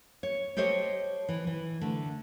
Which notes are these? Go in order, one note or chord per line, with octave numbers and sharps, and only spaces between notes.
C#5
G4 A4 C5 C#5 D#5
E3
E3
D3 A3